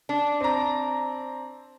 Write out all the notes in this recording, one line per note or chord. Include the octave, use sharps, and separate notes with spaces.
D4
C4 A#5